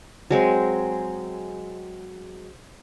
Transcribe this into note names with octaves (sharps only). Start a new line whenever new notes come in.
F#3 G#3 C4